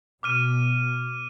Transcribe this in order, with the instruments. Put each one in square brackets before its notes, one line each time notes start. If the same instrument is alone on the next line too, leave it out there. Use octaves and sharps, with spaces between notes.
[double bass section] B2 [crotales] D6 F6 D#7